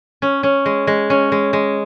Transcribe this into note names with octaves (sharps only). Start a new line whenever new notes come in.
C#4
C#4
G#3
G#3
C#4
G#3
G#3